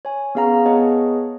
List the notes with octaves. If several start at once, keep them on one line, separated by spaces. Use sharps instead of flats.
C#5 G#5
B3 C#4 G#4 F5 F#5 A#5
B3 G#4 C#5 D#5 F#5 A5